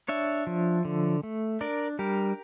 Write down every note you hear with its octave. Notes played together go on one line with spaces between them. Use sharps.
D4 C#5 E5
F3
D3
A3
D4 A#4 D5
G3 G4 A#4